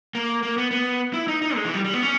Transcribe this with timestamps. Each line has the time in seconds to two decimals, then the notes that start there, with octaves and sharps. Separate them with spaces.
0.15 A#3
0.43 A#3
0.58 B3
0.71 B3
1.13 E4
1.28 D#4
1.42 D#4
1.56 G#3
1.65 E3
1.74 G3
1.84 G3
1.93 B3
2.03 C#4